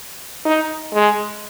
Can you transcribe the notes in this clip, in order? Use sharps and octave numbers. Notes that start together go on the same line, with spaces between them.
D#4
G#3